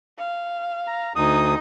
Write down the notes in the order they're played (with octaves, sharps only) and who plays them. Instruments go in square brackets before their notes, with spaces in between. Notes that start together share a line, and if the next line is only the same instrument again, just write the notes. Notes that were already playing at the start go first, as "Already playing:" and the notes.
[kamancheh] F5
[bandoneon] A#5
[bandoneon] D2 D#6 [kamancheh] D#4